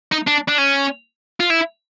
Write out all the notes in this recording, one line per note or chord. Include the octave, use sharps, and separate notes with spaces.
D#4
D4
D4
C#4
F4
E4